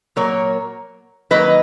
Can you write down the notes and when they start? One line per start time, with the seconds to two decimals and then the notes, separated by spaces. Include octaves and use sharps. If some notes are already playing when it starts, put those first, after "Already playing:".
0.16 A#2 F#3 A#3 A#4 C#5
1.31 D#3 F#3 A#3 B4 D#5